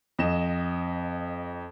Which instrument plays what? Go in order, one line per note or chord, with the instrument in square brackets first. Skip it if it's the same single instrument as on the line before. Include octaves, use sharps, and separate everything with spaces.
[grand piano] F2 D#5 E7